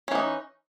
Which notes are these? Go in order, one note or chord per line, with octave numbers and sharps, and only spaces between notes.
E3 C#4 D#4